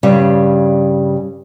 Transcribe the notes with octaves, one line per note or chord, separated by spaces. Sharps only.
G2 C#3 G3